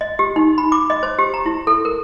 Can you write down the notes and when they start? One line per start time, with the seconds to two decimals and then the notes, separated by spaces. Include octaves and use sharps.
0.01 D#5
0.19 G4
0.36 D#4
0.58 B5
0.72 D6
0.90 D#5
1.03 C5
1.19 G4
1.34 A#5
1.46 E4
1.67 A4
1.85 A#4